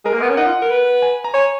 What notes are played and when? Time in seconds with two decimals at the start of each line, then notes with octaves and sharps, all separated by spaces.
0.05 G#3 A#4
0.14 A#3
0.21 B3
0.30 C#4
0.37 D#4 F#5
0.46 F4
0.62 A#4
0.71 B4
1.02 G#5
1.24 A#5
1.34 C#5 G#5